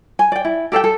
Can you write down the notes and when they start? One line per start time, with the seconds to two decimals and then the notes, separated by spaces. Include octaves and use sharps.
0.19 G#5
0.32 D5 G5
0.45 E4
0.72 G4 A4 F5 G5
0.84 A4